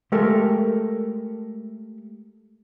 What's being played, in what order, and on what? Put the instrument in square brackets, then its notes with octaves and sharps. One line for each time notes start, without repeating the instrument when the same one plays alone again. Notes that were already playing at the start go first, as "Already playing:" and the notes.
[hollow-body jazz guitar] G#3 A3 G4 A4 A#4